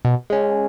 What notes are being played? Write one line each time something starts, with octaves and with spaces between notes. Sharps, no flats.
B2
G#3 C#4